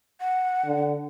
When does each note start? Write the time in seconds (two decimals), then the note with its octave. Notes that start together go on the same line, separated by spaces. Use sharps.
0.20 F#5
0.65 D3